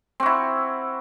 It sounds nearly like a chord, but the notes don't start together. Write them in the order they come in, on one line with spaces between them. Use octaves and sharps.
C4 F#4 E4